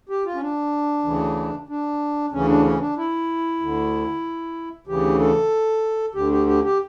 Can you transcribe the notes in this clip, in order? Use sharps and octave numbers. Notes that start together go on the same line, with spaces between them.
G4
F4
C#4
D4
D2 C#3 E3
D4
D2 C#3 E3 C#4
D4
C#4
D4
E4
D2 D3
D2 C#3 E3 G4
A4
D2 D3 G4
G4
G4
G4